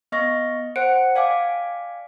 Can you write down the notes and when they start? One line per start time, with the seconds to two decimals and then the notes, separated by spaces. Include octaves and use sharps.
0.12 B3 D#5 C#6 A#6
0.76 C5 F#5 C#7 D7
1.15 D5 F5 G5 G#5 D6